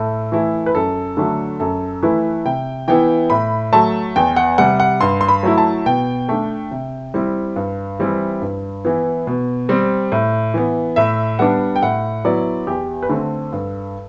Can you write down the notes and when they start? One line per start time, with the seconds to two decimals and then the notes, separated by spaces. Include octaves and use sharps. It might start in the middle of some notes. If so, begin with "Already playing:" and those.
Already playing: A2 A4
0.32 E3 A3 E4
0.66 B4
0.75 F#2 A4
1.17 D3 F#3 A3 D4
1.60 F#2 A4
2.03 E3 A3 E4 B4
2.45 C3 G5
2.88 E3 B3 E4 G5
3.30 A2 B5
3.73 F#3 A3 A5
4.16 E2 G5
4.36 F#5
4.58 C3 G3 F#5
4.80 F#5
5.01 G2 C6
5.21 C6
5.29 B5
5.43 F#3 A3 E4
5.58 A5
5.86 B2 G5
6.29 A3 D4
6.71 C3
7.14 G3 C4 E4
7.56 G2
7.99 E3 G3 C4 E4
8.41 G2
8.84 E3 B3 E4
9.27 B2
9.69 G3 C4
10.12 A2
10.54 E3 B3
10.96 A2 E5
11.39 G3 B3 D4 F#5
11.76 G5
11.82 A2 F#5
12.25 F#3 B3 E4 D5
12.67 E2 G4
13.03 B4
13.10 D3 A3 C4 A4
13.52 G2